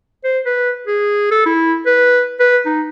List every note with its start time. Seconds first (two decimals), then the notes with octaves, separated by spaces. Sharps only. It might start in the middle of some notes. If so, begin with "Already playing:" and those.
0.24 C5
0.45 B4
0.87 G#4
1.31 A4
1.46 E4
1.86 B4
2.40 B4
2.65 D#4